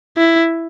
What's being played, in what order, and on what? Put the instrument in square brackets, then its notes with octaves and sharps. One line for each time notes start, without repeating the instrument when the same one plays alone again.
[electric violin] E4